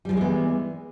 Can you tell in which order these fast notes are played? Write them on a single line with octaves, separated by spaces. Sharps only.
G3 F3 G#3 E3 B3